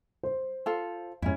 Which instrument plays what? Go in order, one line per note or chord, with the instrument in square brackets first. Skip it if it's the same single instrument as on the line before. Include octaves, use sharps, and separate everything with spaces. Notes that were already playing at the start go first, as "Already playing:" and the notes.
[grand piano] C5
[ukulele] F4 A4
[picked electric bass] F2 G#2 [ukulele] C#4 E4